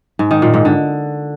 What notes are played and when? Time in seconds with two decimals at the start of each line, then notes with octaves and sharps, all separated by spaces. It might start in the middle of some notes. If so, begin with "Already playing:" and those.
0.19 G#2
0.31 D#3
0.42 A#2
0.54 G#2
0.65 D3